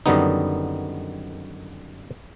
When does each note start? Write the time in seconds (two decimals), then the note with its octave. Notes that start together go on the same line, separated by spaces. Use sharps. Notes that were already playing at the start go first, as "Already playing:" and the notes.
0.06 F#2 D3 D#3 G3 B3 D#4